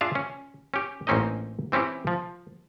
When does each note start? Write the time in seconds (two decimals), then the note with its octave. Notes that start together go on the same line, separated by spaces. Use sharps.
0.01 D4 F4 G#4 E5 F5
0.15 C#4
0.74 C#4 G4
1.07 A1 A#3 C4 C#4 D#4 D#5
1.72 E3 C4 C#4 E4 G4
2.07 F3